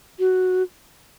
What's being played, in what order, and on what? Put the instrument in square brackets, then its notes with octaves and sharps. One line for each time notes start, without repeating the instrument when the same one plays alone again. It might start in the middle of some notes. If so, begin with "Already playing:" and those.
[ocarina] F#4